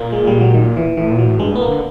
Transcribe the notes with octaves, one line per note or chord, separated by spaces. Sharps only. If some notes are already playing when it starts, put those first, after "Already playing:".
Already playing: A#2 A#3
G#3
G3
F#3
D#3
E3
A2 E3
A#2
F#3
A2
G2 G#3
A2 B3
A#3
D3